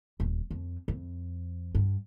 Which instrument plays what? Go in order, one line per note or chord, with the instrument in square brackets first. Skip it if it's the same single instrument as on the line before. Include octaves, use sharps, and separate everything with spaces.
[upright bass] D#1
F2
F2
G2